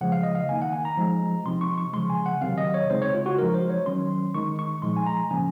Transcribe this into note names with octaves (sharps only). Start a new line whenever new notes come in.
C#3 F3 G#3 F#5
F5
D#5
F5
D#3 A#3 D#4 G#5
F#5
G#5
A#5
F3 G#3 D#4
C3 F3 C4 D#4 C6
C#6
C#6
C#3 F3 G#3 C6
G#5
F#5
C3 D#3 F#3 C4 F5
D#5
C#5
C#3 G#3 C4 D#4 C5
C#5
F4
F#4
F3 G#3 D#4 A#4
C5
C#5
D#3 F#3 C#4 C6
D#3 G#3 D#4 C#6
C#6
A#2 F3 G#3 D#4 C6
G#5
A#5
C#3 F3 A#3 C#4 G#5